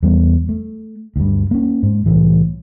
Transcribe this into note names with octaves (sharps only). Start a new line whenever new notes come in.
E2 G3 B3
A3
D2 G2
A#3 C#4
G#2
C2 A2 E3